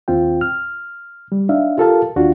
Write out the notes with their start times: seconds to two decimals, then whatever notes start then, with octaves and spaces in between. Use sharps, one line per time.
0.08 D#2 C4 F4 G5
0.41 F6
1.32 G3
1.49 D4 D#4 E5 F5
1.78 F4 G4 A4 A#4 F5 A5
2.16 D#2 D4 F4 F#4